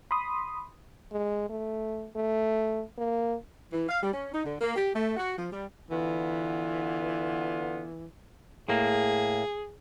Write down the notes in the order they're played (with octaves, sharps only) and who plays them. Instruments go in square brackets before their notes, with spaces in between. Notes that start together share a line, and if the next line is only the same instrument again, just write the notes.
[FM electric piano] B5 C6 D#6
[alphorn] G#3
A3
A3
A#3
[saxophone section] E3
F5
G3
C#4
D#4
D3
A#3
G4
A3
F#4
F3
G3
[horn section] D3 B3 F4 [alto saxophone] E3
[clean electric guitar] A2 A#3 [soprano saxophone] G#4